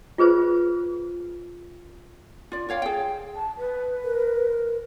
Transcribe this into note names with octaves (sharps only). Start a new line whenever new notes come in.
F4 G#4 B4 C5
F4 D5
F4 C#5 F5 G5
G#4 G5
A5
B4
A#4